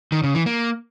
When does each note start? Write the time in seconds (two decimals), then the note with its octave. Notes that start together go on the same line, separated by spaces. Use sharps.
0.12 D#3
0.23 C#3
0.35 E3
0.46 A#3